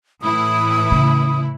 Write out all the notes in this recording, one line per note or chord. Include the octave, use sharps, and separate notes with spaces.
A2 E3 E4 D#6
C#3